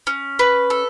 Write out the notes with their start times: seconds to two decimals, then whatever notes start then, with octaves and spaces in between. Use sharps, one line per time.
0.07 C#4
0.39 B4
0.70 A4